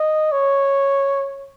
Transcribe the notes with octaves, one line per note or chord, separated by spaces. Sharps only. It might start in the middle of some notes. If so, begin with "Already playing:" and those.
Already playing: D#5
C#5